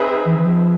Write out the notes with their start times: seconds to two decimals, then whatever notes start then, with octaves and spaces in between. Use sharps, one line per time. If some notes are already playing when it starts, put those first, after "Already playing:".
Already playing: C4 D#4 G#4 B4 E5
0.26 E3
0.39 E3
0.45 F3